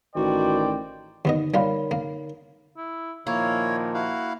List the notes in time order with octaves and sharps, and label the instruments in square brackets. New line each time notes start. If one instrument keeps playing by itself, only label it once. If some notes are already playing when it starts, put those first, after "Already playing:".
[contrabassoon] A1 [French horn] D#3 [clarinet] F#4 [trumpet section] C5 D5 G5
[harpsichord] D#2 B3 D#5 [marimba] D3 D#4
[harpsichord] G3 A#3 F4 [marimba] A#4 C#5 B5
[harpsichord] A#3
[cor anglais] E4
[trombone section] A#2 D#3 F3 [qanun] A#3 [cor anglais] E4 [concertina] C#5
[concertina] E4 F5 [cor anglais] F#4